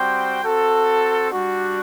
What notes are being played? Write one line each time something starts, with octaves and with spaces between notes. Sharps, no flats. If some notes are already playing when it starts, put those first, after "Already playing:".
Already playing: G3 C4 F#4 C5 G5
C4 F#4 A4
G3 D4 F#4